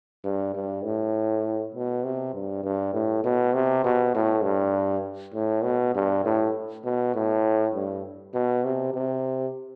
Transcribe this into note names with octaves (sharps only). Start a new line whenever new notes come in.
G2
G2
A2
B2
C3
G2
G2
A2
B2
C3
B2
A2
G2
A2
B2
G2
A2
B2
A2
G2
B2
C3
C3